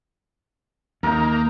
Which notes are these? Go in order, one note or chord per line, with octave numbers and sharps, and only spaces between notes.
D#2 A#3 D#4 A#4